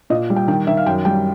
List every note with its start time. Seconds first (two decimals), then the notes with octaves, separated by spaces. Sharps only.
0.10 A#2 D#5
0.30 G3
0.36 G5
0.48 D#3 G5
0.67 D#3 E5
0.77 F5
0.86 F#2 G5
1.05 G3 G5